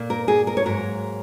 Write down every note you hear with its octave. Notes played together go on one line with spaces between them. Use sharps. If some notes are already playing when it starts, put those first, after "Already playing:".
Already playing: A#2 A#3
A#4
G#4
A#4
C#5
G#2 F#3 A#3 A#4